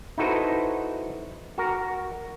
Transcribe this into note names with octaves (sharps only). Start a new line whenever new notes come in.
D#4 E4 F#4 A4 B4 C5
F#4 A#4 A#5